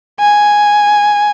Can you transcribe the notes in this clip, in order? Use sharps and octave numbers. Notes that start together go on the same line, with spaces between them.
G#5